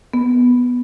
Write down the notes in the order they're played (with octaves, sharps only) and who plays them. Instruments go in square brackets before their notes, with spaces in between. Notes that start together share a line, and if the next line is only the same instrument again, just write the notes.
[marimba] B3